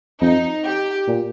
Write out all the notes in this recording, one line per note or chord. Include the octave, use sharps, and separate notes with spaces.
F2 D#4
G4
A#2